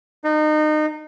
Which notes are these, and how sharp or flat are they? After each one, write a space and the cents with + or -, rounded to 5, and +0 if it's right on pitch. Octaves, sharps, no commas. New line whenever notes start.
D#4 -30